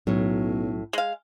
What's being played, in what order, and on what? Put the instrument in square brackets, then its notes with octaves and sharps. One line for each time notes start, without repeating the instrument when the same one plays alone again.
[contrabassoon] B1 [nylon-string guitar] A2 C#4 [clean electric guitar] F#3
[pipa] G#3 F5